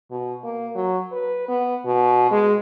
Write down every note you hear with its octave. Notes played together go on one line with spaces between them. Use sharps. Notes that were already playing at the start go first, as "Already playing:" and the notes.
B2
A#3
F#3
B4
B3
B2
G#3